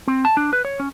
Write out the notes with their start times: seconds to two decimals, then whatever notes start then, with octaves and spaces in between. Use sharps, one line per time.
0.07 C4
0.25 A5
0.37 D4
0.53 B4
0.65 C#5
0.80 C#4